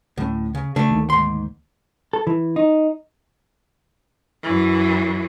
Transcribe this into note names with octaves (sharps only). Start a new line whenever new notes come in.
D2 A2 G3 C#4
C#3
C#3 A3 D4
D2 D#3 A#3
G#2 C6
A4
E3
D#4
F#2 E3